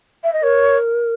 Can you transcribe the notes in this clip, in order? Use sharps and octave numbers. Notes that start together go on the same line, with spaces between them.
E5
D#5
A#4 C#5